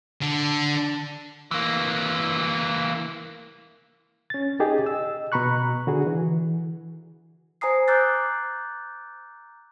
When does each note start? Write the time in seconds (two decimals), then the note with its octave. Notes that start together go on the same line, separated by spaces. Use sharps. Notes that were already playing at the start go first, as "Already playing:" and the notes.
0.22 D3
1.51 E3 A#3
4.30 C#4 A6
4.60 D#4 G4 G#4 D#5
4.85 D#5 E6
5.32 B2 A#5 B5 C#6 F#6
5.87 D3 F#4 G#4
6.07 E3
7.61 C5 G#5 A#5 D#6 C7
7.88 A#5 D6 E6 F#6 G6 A6